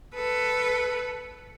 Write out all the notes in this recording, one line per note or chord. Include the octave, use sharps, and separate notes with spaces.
A4 B4